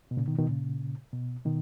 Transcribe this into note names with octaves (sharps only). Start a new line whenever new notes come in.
B2
A#2 C#3
B2 D#3
B2 D#3
A#2 C#3
B2
B2 D#3